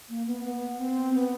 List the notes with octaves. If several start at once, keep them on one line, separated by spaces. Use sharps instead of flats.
A#3
B3
B3
C4
B3